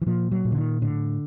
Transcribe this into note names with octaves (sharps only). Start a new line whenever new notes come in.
E3
A#2 F3
F#3
A#2
D3
D#3
A2 D3